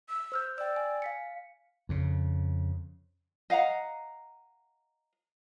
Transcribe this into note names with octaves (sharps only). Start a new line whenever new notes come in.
E6
C5 F6 G6
D5 G5 E6
G#5
F5 B6 C#7
F2 C#3
D#5 F5 F#5 A#5